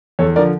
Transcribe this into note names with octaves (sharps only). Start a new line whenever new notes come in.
E2 A4 C#5
D3 F3 A#4 D5